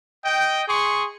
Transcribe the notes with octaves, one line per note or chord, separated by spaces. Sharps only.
D#5 G5
G#4 C6 C#6